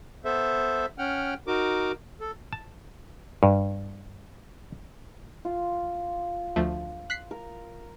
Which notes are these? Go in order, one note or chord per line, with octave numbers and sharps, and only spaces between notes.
B3 A4 C5 E5
C#4 F#5 G5 F6
D#4 F#4 A#4 D6
A4
A5
G2
F4
D2 F3 A3
F#6 B6 C7
A#4